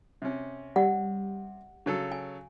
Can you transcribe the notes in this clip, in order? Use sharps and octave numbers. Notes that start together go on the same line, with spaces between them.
C3 C#4
G3 F#5
C#3 F#3 A4
G#5